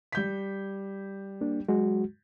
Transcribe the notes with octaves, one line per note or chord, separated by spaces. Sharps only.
G3 G6 B6
A#3 D4
F#3 G#3 F#4